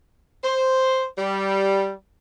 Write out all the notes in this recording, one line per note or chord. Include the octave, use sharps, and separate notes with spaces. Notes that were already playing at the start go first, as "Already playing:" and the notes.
C5
G3